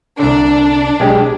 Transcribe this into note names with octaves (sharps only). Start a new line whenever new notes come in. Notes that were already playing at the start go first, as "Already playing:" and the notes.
C2 D3 D4
B1 G#3 G4